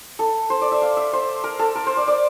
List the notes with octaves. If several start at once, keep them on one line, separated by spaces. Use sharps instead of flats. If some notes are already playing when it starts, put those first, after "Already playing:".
A4
C5
D5
E5
F5
E5
C5
A#4
A4
A#4
C5
D5
D5